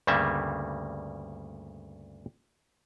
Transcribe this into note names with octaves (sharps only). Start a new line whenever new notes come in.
D2 G2 C#3 G3 A#3 E5